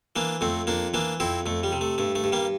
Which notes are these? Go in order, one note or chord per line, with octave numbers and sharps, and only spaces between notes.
E3 A#3 D4
F2 A3 C4
F2 A#3 D4
E3 A#3 D4
F2 C4 E4
F2 A3
G3
C3
A3
G2 A3
A3
G2
G3 A#3